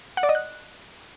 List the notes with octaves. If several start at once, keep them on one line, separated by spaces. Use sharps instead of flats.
F#5
D5
D#5
F#6